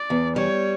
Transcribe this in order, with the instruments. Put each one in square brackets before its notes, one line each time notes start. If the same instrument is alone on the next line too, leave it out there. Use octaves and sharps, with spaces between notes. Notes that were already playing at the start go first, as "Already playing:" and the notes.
Already playing: [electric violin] D5
[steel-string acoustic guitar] E2
[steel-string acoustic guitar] G3 [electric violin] C#5